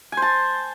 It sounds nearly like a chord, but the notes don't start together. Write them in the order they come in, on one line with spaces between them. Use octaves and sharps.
G#5 C5 A5